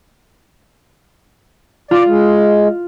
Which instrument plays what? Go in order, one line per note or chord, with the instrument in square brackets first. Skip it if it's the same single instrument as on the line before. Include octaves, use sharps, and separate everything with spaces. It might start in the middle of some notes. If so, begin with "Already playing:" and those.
[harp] F4 [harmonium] D5
[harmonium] G#3